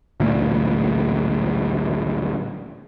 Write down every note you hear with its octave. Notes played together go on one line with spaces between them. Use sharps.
A1 D2 A#2